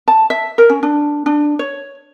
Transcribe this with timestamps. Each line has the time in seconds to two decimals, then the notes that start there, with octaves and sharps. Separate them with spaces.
0.08 A5
0.30 E5
0.58 A#4
0.70 C#4
0.83 D4
1.26 D4
1.59 C#5